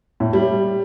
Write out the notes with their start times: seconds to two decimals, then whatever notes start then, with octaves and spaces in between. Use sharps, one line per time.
0.20 A2
0.33 G3